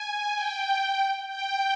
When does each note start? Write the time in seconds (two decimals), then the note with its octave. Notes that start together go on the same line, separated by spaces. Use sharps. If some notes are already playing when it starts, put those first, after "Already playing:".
Already playing: G#5
0.35 G5
1.29 G5